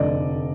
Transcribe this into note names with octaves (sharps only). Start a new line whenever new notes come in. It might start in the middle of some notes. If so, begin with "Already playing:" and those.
Already playing: F1 F2 D3 D5 D#5